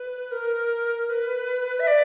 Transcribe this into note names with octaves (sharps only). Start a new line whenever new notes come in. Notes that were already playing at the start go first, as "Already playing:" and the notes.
Already playing: B4
A#4
B4
E5
D5